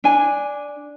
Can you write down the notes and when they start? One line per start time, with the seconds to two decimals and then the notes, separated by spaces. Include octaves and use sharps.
0.04 D4 G#5